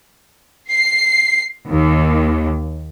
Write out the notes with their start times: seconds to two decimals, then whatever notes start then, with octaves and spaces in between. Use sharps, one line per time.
0.69 C7
1.71 D#2